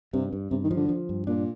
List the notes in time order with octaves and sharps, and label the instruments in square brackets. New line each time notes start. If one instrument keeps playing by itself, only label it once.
[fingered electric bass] G2 [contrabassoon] C3
[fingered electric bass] G2
[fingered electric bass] G2 [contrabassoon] C3
[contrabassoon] D#3
[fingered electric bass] F3
[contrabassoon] D3
[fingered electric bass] F3
G2
[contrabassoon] A#2 [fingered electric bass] D4